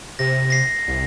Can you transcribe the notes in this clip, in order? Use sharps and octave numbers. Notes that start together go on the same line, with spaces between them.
C3 A#6
A#6 C7
C2